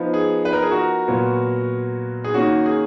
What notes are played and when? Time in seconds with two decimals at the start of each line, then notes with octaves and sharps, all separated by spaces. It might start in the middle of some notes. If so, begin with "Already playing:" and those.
Already playing: F3 B3 D#4
0.14 G#4
0.45 B4
0.53 A#4
0.62 G#4
0.71 F#4 A#4
1.08 A#2 F#3 B3
2.24 G#4
2.34 D#3 A#3 C#4 F#4
2.66 G#4